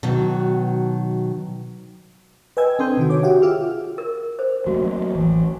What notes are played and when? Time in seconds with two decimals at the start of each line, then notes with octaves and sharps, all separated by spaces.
0.03 B2 D#3 F#3
2.57 B4 D#5 G5 G#5 E6 G#6
2.79 C4 D4 A4 C6 D#6 G6
2.97 C3 D#3 F#4
3.10 C#5 D6
3.23 F#4 G4 E5 F#5 G5
3.42 F4 G#4 D6 E6 F6
3.98 A#4
4.39 C5
4.67 F#3 A3 A#3 F#4
5.15 A1 E3